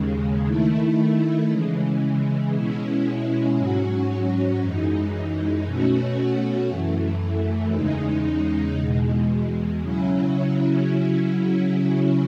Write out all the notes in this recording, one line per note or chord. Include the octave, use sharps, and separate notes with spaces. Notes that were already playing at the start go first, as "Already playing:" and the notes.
Already playing: D#2 C#3 G#3
D#3 A3 E4
C#3 E3 G#3
B2 G#3 C#4 E4
G#2 F#3 C#4 F#4
F#2 E3 G#3 D#4
B2 A3 C#4 F#4
F#2 E3 A3
E2 C#3 G#3 D#4
E2 B2 G#3
C#3 F#3 C#4 E4